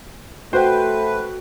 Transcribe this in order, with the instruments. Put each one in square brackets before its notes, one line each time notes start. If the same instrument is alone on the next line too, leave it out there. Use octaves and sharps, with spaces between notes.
[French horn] A3 [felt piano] F#4 G5 [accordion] B4 [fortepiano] C5